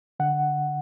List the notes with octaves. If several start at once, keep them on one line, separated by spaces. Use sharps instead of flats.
D3 F#5